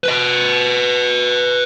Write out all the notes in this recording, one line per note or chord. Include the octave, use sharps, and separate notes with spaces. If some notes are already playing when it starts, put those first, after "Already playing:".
B4 D#5